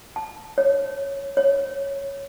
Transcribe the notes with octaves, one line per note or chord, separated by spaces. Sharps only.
A5
C#5
C#5